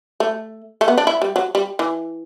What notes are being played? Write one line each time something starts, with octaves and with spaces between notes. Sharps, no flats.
A3
A3
B3
D4
E4
G3
F#3
G3
E3